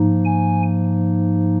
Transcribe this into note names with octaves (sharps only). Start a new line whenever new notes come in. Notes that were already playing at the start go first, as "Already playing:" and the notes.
Already playing: G#2 F3 A#3 D#4
G#5